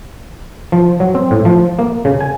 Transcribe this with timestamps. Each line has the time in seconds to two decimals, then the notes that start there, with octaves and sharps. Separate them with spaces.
0.72 F3
1.00 F#3
1.15 C4
1.31 A2
1.45 F3
1.79 A#3
2.05 C#3
2.21 G#5